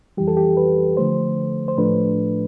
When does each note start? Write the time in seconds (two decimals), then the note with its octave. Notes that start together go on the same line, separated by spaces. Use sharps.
0.17 F2 E3 G3 G4
0.28 A4
0.37 G4
0.57 B4
0.97 D3 F3 A3 C5
1.68 C5
1.77 A2 F3 A3 D4 B4